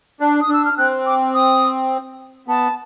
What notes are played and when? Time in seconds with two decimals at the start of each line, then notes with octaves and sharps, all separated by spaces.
0.20 D4
0.41 D#6
0.49 D4 E6
0.65 F6
0.77 C4 F#6
1.06 D6
1.34 D#6
2.48 B3 A5